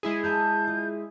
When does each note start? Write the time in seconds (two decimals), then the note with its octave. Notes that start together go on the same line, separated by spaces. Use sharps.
0.03 G#3 E4 G#4
0.24 E5 A5 A#5 G6
0.67 F4